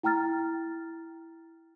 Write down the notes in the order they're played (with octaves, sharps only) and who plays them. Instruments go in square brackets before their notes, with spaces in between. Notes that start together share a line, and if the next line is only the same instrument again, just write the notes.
[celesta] E4 G5 A#5 F6 A6